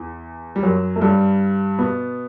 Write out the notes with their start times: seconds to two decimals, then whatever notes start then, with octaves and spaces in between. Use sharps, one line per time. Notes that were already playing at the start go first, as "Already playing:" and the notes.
Already playing: E2
0.56 G3
0.63 F#2 F#3
0.96 A3
1.01 G2 G3
1.78 B2 B3